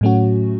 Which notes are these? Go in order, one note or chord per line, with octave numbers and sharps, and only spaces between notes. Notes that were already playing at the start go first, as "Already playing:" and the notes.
A2 F#3 A3 C#4 F#4